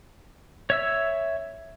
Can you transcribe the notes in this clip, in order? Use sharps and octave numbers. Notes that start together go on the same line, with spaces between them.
C#5 E5 E6